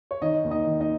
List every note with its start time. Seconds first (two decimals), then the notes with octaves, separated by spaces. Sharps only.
0.11 C#5
0.22 D#3 D#4 D#5
0.44 D#2
0.50 D#4 D#5
0.66 D#3
0.81 D#4 D#5